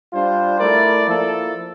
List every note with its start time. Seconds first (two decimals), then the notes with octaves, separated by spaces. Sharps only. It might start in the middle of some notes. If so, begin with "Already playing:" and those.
0.12 G3 D4 F4 C5
0.58 A3 E4 A#4 D5
1.06 F3 A#3 E4 A4